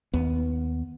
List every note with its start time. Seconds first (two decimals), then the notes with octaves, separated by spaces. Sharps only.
0.14 D#2 B3